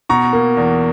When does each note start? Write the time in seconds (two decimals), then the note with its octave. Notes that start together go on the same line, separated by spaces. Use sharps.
0.09 B2 A#5 C#6
0.33 A#3
0.57 E2